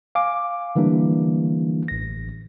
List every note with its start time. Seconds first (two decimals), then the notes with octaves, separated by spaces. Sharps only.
0.15 F5 G#5 D6
0.76 D3 E3 G3 A#3 D4
1.88 A1 A#6